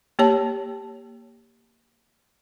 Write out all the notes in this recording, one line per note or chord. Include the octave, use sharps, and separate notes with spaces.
A#3 G4 C#5 A5